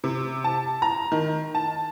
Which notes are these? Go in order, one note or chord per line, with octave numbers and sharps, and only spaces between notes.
C3
A5
A#5
D#3
A5